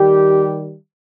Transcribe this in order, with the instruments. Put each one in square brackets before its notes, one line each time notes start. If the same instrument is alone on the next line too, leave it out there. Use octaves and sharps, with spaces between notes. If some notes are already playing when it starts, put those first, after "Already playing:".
Already playing: [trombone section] D#3 G3 G4